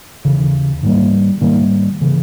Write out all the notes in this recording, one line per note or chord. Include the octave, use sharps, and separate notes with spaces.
D#2 C#3 E3
G#2 D#3 G3 A#3
G#2 D#3 G3 A#3
C#3 E3